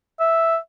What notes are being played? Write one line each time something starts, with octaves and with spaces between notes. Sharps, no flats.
E5